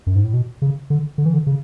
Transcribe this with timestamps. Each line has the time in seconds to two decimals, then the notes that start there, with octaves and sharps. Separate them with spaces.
0.07 F#2
0.16 G#2
0.24 A2
0.33 B2
0.62 C#3
0.90 D3
1.18 D3
1.26 E3
1.34 D3
1.47 C#3